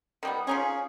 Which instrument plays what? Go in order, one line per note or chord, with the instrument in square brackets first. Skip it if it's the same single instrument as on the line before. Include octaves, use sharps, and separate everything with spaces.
[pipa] D#3 G3 B3
[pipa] F3 D#4 G#4 [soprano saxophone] C#4